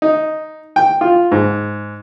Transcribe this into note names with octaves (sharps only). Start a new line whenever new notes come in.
D#4
G5
F4
G#2